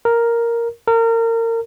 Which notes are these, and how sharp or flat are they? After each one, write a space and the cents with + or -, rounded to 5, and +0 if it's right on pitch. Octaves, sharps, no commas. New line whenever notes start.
A#4 +0
A#4 -30